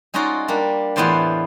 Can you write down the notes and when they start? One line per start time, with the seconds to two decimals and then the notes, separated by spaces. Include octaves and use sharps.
0.14 G#3 C#4 D#4 F4 F#4 D5
0.48 G3 A#3 D4
0.96 E2 A2 B3 F4 C5 D5